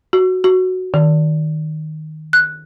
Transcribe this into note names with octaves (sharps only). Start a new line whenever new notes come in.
F#4
F#4
D#3
F#6